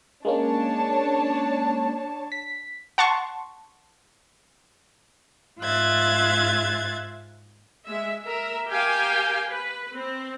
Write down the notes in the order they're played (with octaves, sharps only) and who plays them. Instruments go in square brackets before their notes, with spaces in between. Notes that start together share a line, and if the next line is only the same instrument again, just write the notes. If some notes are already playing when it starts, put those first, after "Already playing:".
[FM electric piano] G#3 A#3 C#4 [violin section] D4 C#5 A5
[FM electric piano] B6
[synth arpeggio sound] F#5 A5 C6 C#6
[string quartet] G#2 F4 E5 F#6 G#6 A6
[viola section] G#3 E5
A#4 E5
G4 A#4 F5 G5 G#5
B4
C4